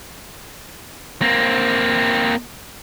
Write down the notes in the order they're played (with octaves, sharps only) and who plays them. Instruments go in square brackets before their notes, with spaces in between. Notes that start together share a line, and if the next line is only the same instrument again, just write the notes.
[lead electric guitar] A#3 C4